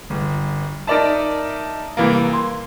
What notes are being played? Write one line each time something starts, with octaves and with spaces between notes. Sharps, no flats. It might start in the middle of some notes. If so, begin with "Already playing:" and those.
G1
D#4 A#4 D5 E5 A5
C2 E3 A#3
C6